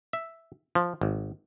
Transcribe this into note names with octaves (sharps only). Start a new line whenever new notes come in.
E5
F3
G#1